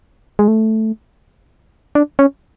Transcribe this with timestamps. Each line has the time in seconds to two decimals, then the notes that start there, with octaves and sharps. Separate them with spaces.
0.39 G#3
0.48 A3
1.95 D4
2.19 C#4